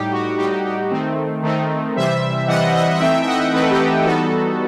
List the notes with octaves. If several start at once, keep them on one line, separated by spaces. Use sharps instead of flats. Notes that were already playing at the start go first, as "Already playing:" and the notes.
Already playing: A2 G3 D#4 G4
F#4
A2 G3 D#4 G4
G4
D#3 A3 C4 D#4
D#3 A3 C4 D#4
C3 E3 G3 C5 E5
C3 E3 G3 D#5 F#5
D#5 F#5
F#5
E3 A3 C4 D#4 E5 G5
E5
D#5 F#5
E3 A3 C4 D#4 B4
A4
G4 B4
E3 G3 B3 D#4 F#4 A4